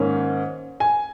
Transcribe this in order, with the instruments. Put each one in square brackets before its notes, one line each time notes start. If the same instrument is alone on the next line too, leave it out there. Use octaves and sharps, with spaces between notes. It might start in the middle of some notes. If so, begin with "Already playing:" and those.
Already playing: [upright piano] G#2 D#3 A#3 C#4
G#5